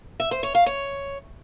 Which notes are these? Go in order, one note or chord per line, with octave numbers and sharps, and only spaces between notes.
E5
C5
C#5
F5
C#5